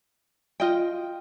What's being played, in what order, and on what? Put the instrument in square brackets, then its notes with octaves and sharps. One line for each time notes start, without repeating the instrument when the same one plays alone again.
[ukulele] F4 D#5 G5